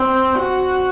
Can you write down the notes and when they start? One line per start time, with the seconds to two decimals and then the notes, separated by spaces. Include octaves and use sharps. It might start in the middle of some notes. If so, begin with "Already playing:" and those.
Already playing: C4
0.39 F#4